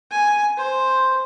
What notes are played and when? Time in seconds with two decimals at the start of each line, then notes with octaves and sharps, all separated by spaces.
0.11 G#5
0.57 C5